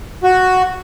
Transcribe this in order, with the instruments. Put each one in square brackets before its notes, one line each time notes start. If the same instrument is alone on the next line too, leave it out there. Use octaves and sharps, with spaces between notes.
[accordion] F#4